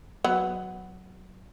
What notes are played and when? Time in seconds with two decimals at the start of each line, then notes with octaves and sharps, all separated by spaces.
0.24 F#3 B3 F#5